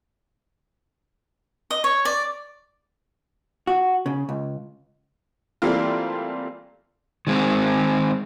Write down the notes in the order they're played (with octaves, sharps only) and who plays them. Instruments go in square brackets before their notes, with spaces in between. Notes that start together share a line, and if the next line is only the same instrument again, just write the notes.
[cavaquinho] D#5
C#5
D5
[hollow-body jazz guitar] F#4
C#3
C#2
[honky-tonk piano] E3 G3 A3 A#3 C4 F4
[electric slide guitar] D#3 G#3 C4